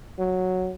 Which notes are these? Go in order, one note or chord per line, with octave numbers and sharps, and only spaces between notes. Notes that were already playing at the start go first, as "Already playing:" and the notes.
F#3